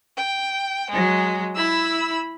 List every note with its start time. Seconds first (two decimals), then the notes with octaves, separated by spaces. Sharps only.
0.17 G5
0.91 F#3 G#3
1.55 E4 B5 E6